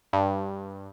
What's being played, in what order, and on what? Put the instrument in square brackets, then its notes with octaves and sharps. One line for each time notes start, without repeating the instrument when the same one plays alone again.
[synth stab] G2